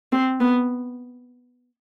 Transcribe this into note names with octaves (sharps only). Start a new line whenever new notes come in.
C4
B3